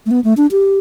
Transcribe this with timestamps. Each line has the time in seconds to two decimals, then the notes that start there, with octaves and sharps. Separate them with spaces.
0.06 A3
0.11 B3
0.24 A3
0.37 D4
0.52 G4